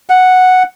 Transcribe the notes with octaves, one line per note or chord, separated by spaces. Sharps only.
F#5